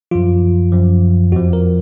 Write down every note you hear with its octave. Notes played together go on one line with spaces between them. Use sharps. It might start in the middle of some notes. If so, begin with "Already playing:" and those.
F#2 F3 F4
F#2 F3
F2 F3 F#4
A#4